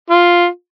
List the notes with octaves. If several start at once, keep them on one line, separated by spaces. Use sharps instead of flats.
F4